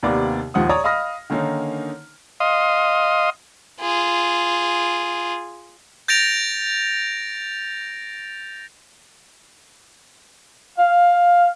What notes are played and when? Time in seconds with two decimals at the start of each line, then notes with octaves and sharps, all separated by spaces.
0.03 D#2 C3 A#3 B3 D5 D6
0.54 D#1 D#2 F3 F#5 D#6
0.69 C#5 D5 A#5 D#6
0.84 D#5 F5 B5 D#6 F6 A#6
1.30 D3 D#3 A#3 C#4 D#4
2.40 D#5 F5 C6 D#6
3.81 F4 G#4
6.08 G6 A6 A#6 D7 F7
10.78 F5